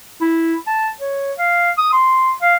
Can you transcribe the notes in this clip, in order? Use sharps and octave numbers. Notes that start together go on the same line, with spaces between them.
E4
A5
C#5
F5
D#6
C6
F5